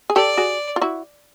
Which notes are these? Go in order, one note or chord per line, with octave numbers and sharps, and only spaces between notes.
G#4
G4 A4 D5
F#4 G#4
F4
E4 F#4